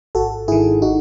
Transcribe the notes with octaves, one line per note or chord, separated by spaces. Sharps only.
G#1 F#4 A4
G#2 D#3 E4 G#4
D#4 F#4